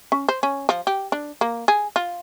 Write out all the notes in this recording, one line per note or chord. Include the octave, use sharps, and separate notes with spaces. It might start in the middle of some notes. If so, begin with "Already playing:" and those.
C#4
C5
C#4
F3
G4
D4
A#3
G#4
F4